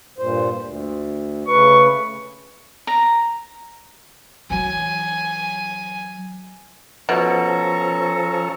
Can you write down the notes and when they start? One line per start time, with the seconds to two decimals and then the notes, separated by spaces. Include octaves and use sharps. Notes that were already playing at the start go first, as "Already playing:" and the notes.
0.18 G2 A#2 C5
0.60 D2
1.48 C#3 A3 B4 C#6
2.87 A#5
4.50 E3 F#3 G#5
7.09 B2 F3 C#4 A4 A#5 C#6